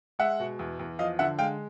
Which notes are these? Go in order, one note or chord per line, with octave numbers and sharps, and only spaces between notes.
G#3 E5 F#5
B2
E2
E2
F3 D#5 F5
D3 E5 F#5
G#3 F5 G5